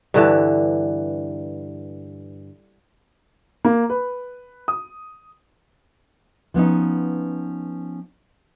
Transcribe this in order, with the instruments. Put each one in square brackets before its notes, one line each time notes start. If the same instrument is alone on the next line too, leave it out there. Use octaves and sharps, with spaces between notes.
[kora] G2 D3 E3
[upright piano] A#3
B4
D#6
[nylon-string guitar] F3 B3 C#4 D#4